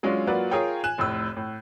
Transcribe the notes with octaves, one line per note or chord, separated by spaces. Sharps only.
F#3 G#3 C#4 D4 F4 F#4
F#3 A#3 F4 F#4 B4 D5
F4 G#4 A#4 C#5 G5
G#5 F#6 E7
F1 A2 E6
A2